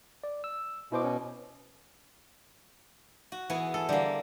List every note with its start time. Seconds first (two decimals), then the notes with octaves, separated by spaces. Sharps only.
0.24 D5
0.44 E6
0.92 B2 E4 C5 D6
1.04 C#4
3.32 F#4
3.50 E3 B3 G#4
3.74 A4
3.89 D3 G3 A#3